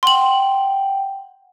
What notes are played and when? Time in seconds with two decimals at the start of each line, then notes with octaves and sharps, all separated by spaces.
0.03 F#5 G5 C6 F#7